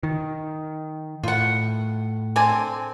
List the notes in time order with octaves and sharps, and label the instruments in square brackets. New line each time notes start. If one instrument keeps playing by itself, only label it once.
[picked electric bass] D#3
[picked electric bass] A2 [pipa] F4 F#5
[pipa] D3 C4 G#5